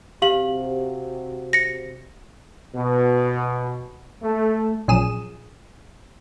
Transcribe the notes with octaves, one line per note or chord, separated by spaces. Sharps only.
C3 F#4 G4 F5 F#7
A#6 C#7
B2
A3
A#1 F#2 G#4 D#6 E7